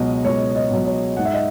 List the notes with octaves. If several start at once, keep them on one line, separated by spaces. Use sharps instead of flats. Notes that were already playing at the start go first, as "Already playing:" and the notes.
Already playing: C#2 B2 F#3 C#5 D#5
C#2 C#5
D#5
B2 F#3
C#5
G#2 F#5
E5
D#5